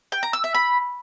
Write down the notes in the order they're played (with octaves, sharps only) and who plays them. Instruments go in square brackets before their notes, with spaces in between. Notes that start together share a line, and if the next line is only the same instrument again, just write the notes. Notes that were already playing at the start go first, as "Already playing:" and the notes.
[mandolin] G5
A#5
E6
E5
B5